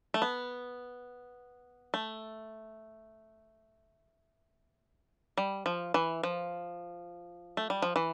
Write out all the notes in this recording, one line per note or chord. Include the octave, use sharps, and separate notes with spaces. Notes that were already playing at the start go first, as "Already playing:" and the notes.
A3
B3
A3
G3
F3
E3
F3
A3
G3
F3
E3